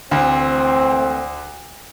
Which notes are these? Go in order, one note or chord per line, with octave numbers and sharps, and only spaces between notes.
D2 E3 A3 C4